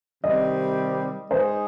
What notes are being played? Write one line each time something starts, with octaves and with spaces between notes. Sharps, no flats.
C3 D#3 G3 C4 D#5
G#3 D#4 G#4 C5